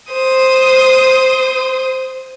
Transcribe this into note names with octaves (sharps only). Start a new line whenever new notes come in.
C5 D#6